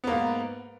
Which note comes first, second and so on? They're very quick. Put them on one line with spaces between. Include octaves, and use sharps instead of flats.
B3 A#3 G#2